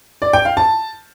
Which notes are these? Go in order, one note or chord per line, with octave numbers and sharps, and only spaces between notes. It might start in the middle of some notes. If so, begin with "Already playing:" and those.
D5
G5
F5
A5